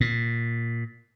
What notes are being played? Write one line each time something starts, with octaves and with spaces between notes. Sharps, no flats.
A#2